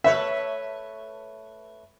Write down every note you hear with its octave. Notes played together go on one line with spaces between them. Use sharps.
A3 B4 C#5 E5